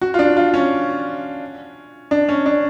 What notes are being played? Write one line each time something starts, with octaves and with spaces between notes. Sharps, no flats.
F#4
F4
D4
F4
C#4
D4
C#4
D4